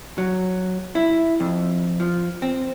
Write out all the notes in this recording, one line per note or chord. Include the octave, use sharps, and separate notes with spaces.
F#3
E4
F2
F3
C4